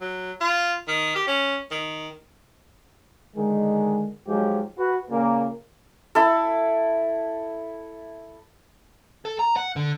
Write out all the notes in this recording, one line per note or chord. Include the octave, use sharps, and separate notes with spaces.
F#3
F4
D#3
G4
C#4
D#3
D3 D#3 G#3
G#2 F3 F#3 G#3 G4
F#4 B4
A#2 C#3 A#3
E4 A4
A4
A#5
F#5
D3